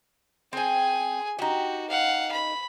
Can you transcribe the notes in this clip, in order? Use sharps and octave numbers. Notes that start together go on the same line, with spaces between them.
C4 G#4 G5 G#5
D#4 F#4 G4
F5 F#5
B5